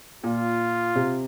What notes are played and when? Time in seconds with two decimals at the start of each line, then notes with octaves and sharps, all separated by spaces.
0.24 A#2 F4
0.96 C3